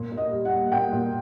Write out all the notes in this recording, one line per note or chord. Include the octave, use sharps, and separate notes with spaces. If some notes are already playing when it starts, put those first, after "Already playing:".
Already playing: A#2
A#2
D#5
G3
F#5
A#3
A#2 G5
A#2